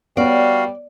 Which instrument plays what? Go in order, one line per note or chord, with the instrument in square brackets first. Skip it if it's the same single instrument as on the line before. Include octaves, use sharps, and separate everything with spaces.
[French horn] G3 [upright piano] B3 C#5 [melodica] F#4 F5 [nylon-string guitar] D5